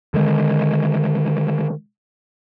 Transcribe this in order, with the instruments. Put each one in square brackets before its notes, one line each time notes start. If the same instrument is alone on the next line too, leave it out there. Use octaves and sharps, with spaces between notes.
[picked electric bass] D3 D#3 G#3